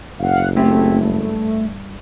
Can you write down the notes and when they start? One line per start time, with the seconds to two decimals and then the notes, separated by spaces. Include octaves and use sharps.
0.20 F#1 F5 F#5
0.56 A3 C4 E4 G4
1.02 G2